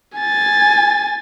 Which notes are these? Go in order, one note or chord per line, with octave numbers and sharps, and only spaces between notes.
G#5 A6